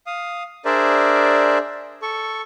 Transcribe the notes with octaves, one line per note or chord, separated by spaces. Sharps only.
F5 D#6
D4 G#4 A#4 C5 D5 E5
A4 C#6